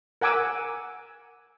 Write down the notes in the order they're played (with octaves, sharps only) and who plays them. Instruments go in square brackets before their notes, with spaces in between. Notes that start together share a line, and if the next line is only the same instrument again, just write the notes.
[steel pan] A#4 F#5 G#5 D6 E6